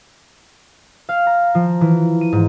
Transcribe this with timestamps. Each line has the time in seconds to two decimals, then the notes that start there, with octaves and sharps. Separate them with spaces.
1.09 F5
1.27 A#5
1.55 F3
1.81 E3
2.21 D#7
2.33 G#2